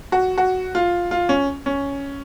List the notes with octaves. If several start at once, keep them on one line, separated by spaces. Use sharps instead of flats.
F#4
F#4
F4
F4
C#4
C#4